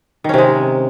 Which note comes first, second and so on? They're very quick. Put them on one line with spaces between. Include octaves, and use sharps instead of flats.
D#3 C#4 C3 G#3